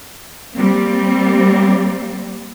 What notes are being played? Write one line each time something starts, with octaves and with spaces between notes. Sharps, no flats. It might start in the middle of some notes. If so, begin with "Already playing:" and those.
G3 A#3 C4